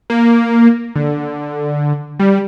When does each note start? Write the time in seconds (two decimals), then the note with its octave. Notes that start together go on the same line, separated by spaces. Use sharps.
0.10 A#3
0.96 D3
2.20 G3